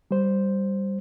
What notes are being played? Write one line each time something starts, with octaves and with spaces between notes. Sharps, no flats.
G3 C5